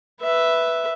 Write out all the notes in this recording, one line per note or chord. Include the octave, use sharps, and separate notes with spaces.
B4 E5